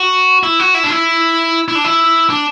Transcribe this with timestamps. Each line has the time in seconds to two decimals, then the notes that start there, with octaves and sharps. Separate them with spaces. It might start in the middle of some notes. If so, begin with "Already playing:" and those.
Already playing: F#4
0.43 E4
0.60 F#4
0.74 E4
0.84 D4
0.90 E4
1.68 E4
1.75 D4
1.84 E4
2.30 D4